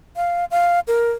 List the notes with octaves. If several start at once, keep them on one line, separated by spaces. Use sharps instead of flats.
F5
F5
A#4